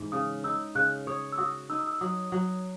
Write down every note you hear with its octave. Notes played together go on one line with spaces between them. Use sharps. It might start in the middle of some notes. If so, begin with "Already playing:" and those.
Already playing: G#2 E3
C#3 D#6
D#4 E6
C#3 F#6
C#5 D#6
E6
F#4 D#6
D#4 E6
D#6
E6
F#3 D#6
F#3